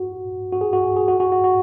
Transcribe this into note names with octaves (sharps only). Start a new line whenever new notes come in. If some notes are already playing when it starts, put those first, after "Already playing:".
Already playing: F#4
F#4
G#4
F#4
G#4
G#4
F#4
F#4
F#4
F#4